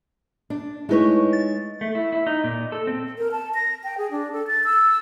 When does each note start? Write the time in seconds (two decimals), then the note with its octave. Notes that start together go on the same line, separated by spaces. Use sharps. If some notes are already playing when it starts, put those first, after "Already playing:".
0.50 D4
0.89 G#3 A3 D#4 E4 B4 C#5
1.33 A6
1.81 A3
1.95 E4
2.12 E4
2.27 D#4
2.44 A#2
2.72 A4
2.87 C4
3.18 A#4
3.32 A5
3.55 A#6
3.84 G5
3.98 G#4
4.11 D4
4.33 A4
4.47 A6
4.64 E6